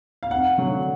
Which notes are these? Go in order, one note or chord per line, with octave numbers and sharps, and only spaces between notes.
F5
F2 F#5
D3 F#3